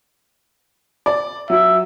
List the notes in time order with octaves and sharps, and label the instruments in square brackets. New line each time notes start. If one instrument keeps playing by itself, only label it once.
[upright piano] D5
[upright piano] F#3 [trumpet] E5